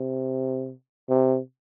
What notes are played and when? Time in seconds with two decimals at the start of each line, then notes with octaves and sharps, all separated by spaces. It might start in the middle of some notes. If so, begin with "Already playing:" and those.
Already playing: C3
1.09 C3